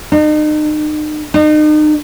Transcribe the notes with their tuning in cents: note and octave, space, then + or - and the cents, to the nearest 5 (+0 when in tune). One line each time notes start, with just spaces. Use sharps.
D#4 -40
D#4 -35